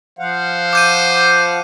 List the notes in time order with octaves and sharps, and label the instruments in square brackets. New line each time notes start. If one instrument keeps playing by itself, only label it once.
[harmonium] F3 F5 F#5 [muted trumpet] C5
[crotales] D6 G6 D#7